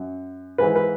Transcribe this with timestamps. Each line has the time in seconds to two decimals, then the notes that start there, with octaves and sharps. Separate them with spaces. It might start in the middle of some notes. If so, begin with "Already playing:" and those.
Already playing: F#2
0.58 G#2 E3 B4
0.76 B4